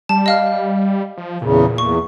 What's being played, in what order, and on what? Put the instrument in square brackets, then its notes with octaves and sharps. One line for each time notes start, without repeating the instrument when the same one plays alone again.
[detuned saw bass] G3 [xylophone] A5
[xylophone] D#5 F5 F6
[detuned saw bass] F3
[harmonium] E2 C#3 [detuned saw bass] A#2
[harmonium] E2 [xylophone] C#6